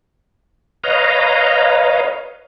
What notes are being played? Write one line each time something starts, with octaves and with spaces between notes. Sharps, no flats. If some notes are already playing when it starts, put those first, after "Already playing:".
B4 C#5 D#5 F5 A#5